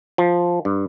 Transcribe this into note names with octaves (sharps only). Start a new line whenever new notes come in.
F3
G2